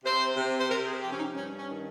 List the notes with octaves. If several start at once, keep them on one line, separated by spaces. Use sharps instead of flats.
C3 C5
C3
C5
C3 A#4
G#4
F3 G4
C#4
D#4
G2 C#4
C#4
D#3